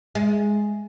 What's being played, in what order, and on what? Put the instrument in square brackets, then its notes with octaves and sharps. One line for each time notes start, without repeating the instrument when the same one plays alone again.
[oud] G#3